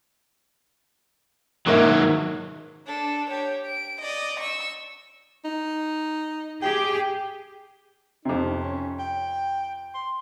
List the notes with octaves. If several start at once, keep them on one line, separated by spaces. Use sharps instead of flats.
G#2 D#3 F#3 A#3 E4
D4 A4
G4 C#5
D7
D5 D#5
C#6 E6
D#4
G4 G#4 G5
F2 C3 D#4
C#4
G5
C6